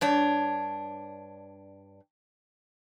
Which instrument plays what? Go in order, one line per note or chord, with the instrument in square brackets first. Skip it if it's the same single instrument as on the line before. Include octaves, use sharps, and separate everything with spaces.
[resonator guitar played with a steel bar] G2 D4 C#5